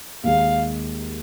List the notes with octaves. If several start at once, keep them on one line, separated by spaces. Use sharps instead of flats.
D#2 D#3 G#3 F5